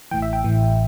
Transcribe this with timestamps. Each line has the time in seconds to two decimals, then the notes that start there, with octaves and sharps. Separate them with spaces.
0.11 A1 A2 E3 G5
0.22 E5
0.33 G5
0.44 A1 A2 E3